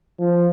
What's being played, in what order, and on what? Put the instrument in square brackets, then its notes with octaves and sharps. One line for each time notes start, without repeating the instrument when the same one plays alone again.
[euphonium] F3